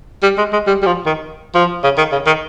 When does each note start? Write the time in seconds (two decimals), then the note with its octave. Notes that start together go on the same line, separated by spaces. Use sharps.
0.23 G3
0.38 G#3
0.53 G#3
0.67 G3
0.82 G3
0.86 F3
1.06 D#3
1.55 F3
1.84 C#3
1.98 D#3
2.12 C#3
2.27 D#3